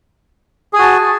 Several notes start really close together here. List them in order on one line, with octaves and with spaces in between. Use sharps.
G#4 G#5 F#4 A5